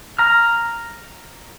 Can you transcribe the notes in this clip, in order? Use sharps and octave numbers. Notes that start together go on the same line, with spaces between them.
A#5 F6